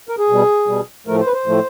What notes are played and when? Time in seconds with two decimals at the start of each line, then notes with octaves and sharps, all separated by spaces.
0.09 A#4
0.19 G#4
0.29 B2 G3
0.67 B2 G3
1.07 A2 F3 A3 A#4
1.20 C5
1.26 B4
1.33 C5
1.46 A2 F3 A3